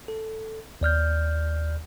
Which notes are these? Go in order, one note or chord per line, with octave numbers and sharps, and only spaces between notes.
A4
D#2 D5 F6 G6